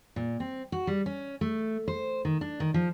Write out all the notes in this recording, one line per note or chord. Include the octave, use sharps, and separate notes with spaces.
A#2
C4
F#4
G3
C#4
A3
C5
D#3
D4
D#3
F3